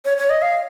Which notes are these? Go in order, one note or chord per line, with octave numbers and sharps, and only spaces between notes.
C#5
C#5
D#5
F5